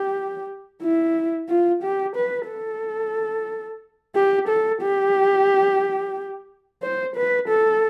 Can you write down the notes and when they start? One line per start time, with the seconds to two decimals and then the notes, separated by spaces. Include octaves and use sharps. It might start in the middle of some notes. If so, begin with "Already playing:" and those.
Already playing: G4
0.82 E4
1.49 F4
1.83 G4
2.16 B4
2.49 A4
4.15 G4
4.49 A4
4.82 G4
6.82 C5
7.16 B4
7.48 A4